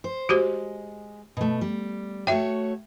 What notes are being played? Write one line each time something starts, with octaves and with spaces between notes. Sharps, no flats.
C5
G#3 F#4 G4 C5
B2 A3
G3
A3 F#4 C#5 E5 G5